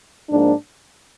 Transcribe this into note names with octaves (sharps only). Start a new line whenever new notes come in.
G#2 F3 A#3 D4